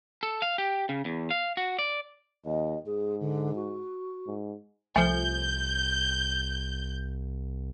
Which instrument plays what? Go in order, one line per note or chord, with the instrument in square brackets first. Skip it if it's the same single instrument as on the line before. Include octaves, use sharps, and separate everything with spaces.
[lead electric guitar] A4
F5
G4
C#3
E2
F5
F#4
D5
[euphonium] D#2 [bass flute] D#5
[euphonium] G#2 [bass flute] G#4
[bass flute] D3
F#4
[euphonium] G#2
[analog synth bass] C2 [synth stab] F3 A3 [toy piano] G#5 [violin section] G6